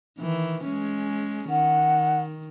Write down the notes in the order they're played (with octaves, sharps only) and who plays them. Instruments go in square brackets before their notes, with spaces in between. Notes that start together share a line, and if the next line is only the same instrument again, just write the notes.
[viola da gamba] D#3 E3
G#3 C#4
[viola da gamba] D#3 [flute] F#5